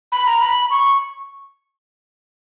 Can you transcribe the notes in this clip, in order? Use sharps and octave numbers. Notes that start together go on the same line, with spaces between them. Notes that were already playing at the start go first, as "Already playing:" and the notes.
B5
A#5
B5
C#6